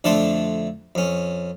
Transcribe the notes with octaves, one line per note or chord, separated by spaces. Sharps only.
F2 D3 A3 D4 A5 C6
F2 C#4